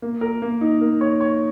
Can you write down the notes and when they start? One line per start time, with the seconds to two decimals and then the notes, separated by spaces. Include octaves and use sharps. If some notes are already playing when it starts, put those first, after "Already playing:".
0.02 A#3
0.21 A#4
0.42 A#3
0.61 D#4
0.81 A#3
1.01 C#5
1.21 C#5